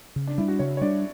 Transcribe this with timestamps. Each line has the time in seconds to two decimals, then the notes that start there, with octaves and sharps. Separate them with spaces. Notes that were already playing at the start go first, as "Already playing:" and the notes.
0.16 C#3
0.27 D4
0.38 G3 D4 E4
0.48 F#4
0.59 C#3 C#5
0.77 C#5
0.81 G3 D4 D5